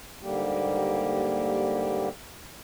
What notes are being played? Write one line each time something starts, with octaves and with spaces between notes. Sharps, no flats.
D#2 G#2 D3 G3 A#3 G4